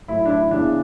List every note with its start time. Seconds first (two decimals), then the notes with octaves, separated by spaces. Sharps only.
0.08 A2 F#3 E4
0.25 D4
0.30 E4
0.51 E2 C#3 E3 D4